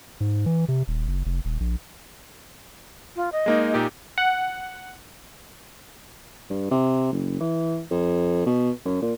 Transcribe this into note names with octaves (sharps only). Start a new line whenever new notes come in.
G#2
E3
C3
D#1
F#1
F1
D#1
A#1
F4
D#5
G#3 A#3 D#4
A#2 D#4 G4
F#5
G2
C3
F#1
E3
F2
B2
F#2
A#2